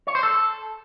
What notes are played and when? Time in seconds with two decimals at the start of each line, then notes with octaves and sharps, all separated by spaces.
0.07 C#5
0.15 C5
0.23 A4